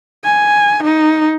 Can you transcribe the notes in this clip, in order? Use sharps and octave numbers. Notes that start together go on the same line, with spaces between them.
G#5
D#4